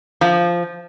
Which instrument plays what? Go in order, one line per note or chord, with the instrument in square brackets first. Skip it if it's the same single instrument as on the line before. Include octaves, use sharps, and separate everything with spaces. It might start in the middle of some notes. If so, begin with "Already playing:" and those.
[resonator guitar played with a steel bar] F3